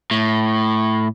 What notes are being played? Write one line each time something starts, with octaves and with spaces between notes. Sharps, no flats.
A2